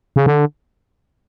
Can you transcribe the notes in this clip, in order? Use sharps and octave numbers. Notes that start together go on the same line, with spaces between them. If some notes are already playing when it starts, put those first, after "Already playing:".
C#3
D3